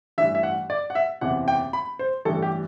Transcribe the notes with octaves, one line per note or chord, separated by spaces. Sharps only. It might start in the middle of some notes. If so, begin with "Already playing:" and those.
A1 G2 E3 E5
E5
F#5
D5
F#5
E5
F#1 E2 C3 E3 F#5
G5
B5
C5
A1 G2 E3 A4
G4